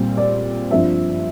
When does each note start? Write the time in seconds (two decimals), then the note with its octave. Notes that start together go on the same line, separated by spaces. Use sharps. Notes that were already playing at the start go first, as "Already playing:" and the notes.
Already playing: A#2 G3 C4
0.17 D5
0.71 G2 F3 C4 E5